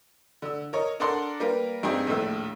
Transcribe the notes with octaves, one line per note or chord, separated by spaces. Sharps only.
D3 E6
A#4 C#5 D#5
D4 A4 A#4 D5 F#5 C6
G3 A#3 A#4 B4
G2 C4 D#4 G4 G#4
A#1 D#2 A2 A3 E6